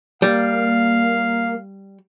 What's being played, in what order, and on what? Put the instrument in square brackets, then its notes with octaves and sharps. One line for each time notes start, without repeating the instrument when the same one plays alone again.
[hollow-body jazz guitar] G3 [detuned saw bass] A#3 [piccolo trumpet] F5